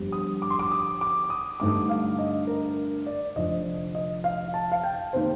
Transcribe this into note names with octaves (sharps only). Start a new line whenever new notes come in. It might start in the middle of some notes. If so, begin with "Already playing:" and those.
Already playing: G1 F2 D3 G3
D#6
D6
C6
D6
D#6
D6
D#6
G2 D3 A3 D#4 D6
F5
D#5
A#4
D5
F1 F2 D3 F3 D#5
D#5
F5
A5
F5
G5
C3 D#3 A#3 C5